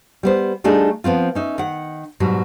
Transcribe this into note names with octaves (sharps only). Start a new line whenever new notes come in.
G3 B3 C5
G3 A3 D4 D#4 F4 G#4
F3 B3 C4 F4
C#4 D#4 E5
D#3 F#5
G#2 B2 F#3 G3